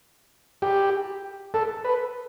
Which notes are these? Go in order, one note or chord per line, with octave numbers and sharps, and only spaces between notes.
G4
A4
B4